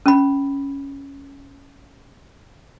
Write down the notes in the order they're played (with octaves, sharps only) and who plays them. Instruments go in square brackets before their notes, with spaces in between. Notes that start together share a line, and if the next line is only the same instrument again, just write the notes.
[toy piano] C#4 B5